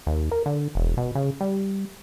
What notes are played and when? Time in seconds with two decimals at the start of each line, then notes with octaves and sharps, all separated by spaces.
0.07 D#2
0.31 A#4
0.46 D3
0.75 E1
0.97 B2
1.15 C#3
1.41 G3